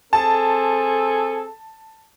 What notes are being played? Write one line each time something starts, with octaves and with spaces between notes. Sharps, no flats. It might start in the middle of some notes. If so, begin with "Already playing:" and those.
C4 G#4 A4 A5